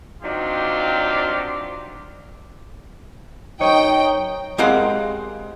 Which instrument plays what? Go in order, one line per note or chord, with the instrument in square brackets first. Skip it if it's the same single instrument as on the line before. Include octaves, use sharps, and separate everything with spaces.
[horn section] F#3 C4 D4 D#4 F4 G4
[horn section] F#2 D#4 [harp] C#5 [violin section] G5
[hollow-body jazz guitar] G#3 C4 G4 A#4 F5 F#5